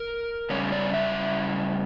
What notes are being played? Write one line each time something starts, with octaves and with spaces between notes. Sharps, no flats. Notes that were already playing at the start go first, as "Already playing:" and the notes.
Already playing: A#4
C#3 G3 C#4 C#5
D5
E5